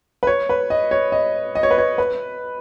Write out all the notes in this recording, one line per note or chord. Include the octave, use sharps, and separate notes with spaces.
B4
C#5
B4
D#5
C#5
D#5
D#5
C#5
B4
C#5
B4